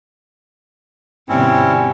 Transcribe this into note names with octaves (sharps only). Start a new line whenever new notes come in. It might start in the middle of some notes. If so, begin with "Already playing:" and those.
G2 B2 D3 C4 C#4 E4